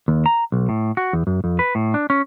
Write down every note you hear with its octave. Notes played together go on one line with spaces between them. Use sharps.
D#2
A#5
B1
A2
F#4
E2
F#2
F2
B4
A2
D4
C#4